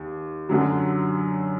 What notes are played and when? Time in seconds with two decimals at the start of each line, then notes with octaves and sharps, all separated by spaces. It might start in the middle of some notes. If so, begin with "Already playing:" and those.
Already playing: D#2
0.49 F#2 D3 F#3